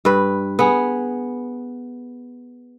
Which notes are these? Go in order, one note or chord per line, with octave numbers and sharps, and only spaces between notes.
G2 B4
B3 G#4